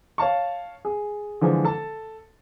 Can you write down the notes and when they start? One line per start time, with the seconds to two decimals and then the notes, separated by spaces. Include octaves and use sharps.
0.18 C#5 F5 A5 C#6
0.85 G#4
1.41 D3 E3 F3 G#3
1.65 A4 A5